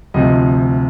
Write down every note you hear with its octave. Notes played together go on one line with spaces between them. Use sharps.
D2 C3 F3 D#5